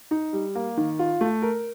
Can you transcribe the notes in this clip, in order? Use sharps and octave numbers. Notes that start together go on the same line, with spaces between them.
D#4
G3
A#3
D#3
F4
A3
A#4